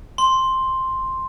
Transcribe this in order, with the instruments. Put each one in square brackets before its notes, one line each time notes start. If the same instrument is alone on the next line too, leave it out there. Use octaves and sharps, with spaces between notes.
[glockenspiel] C6